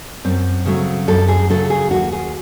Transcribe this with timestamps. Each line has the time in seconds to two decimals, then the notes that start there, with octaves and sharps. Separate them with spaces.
0.24 F#2 C4
0.66 C#3 F#3 A3
1.08 F#2 A4
1.28 G#4
1.50 C#3 F#3 A3 A4
1.70 G#4
1.90 D#2 F#4
2.12 G#4